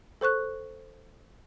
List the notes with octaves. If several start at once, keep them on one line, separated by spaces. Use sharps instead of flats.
A4 C5 C#6 F#6